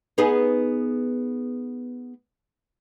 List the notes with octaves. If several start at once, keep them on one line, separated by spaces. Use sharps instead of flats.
B3 D#4 G#4